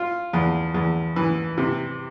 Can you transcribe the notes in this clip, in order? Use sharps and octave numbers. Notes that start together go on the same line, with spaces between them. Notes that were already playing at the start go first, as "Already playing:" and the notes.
Already playing: F4
E2
E2
E3
C3